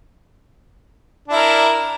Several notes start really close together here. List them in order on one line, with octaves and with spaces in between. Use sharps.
D4 E4 A#4